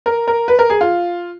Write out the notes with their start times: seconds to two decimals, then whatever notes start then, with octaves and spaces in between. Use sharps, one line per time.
0.06 A#4
0.28 A#4
0.48 B4
0.59 A#4
0.70 G#4
0.81 F4